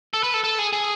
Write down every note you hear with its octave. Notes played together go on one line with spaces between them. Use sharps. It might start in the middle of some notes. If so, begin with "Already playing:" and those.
A4
B4
A4
A4
G#4
G#4